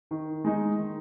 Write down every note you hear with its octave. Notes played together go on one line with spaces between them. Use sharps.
D#3
G#3 D#4
D#3